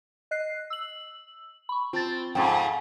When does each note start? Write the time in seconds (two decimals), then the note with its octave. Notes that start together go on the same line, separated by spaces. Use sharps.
0.31 D#5 F#6 C7
0.70 E6 F#7
1.69 B5 C#6
1.93 C4 F4 A5 A6
2.35 F2 G#2 G5 C#6